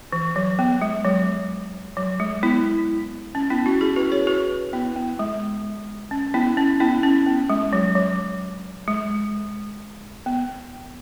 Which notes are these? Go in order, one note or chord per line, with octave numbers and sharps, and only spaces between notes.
E3
F#3
B3
G#3
F#3
F#3
G#3
B3 E4
C#4
B3 E4
C#4 F#4
E4 G#4
F#4 B4
G#4 C#5
F#4 B4
B3 E4
B3
G#3
C#4
B3 E4
C#4
B3 E4
C#4
B3
G#3
F#3
F#3
G#3
B3